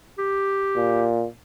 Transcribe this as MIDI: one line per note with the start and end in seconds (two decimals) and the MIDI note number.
0.18 1.07 67
0.76 1.26 46